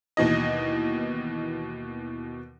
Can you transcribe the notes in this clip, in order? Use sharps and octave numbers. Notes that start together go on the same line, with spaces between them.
D#2 B2 E3 D#5